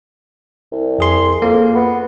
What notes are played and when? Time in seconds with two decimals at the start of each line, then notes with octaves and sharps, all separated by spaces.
0.72 C2
0.99 F2 G#4 C6
1.42 F2 A#3
1.75 B3